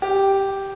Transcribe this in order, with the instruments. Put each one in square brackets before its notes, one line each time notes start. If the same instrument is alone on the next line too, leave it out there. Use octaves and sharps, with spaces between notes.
[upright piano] G4